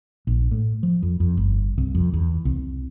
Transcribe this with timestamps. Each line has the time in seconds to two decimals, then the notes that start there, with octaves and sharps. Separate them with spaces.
0.27 A#1
0.51 A2
0.83 F3
1.03 F2
1.20 F2
1.37 G1
1.78 C2
1.95 F2
2.13 E2
2.45 C2